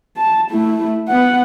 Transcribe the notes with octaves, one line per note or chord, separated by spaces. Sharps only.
A5
A3 E4
B3 F#5